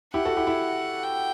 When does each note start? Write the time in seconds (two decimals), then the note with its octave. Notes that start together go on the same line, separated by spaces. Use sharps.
0.14 E4 G4 F#5
0.25 F#4 A4
0.37 E4 G4
0.47 E4
1.03 G5